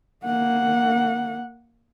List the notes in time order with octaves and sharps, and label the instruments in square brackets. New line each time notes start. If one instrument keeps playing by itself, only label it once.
[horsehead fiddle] A#3 F#5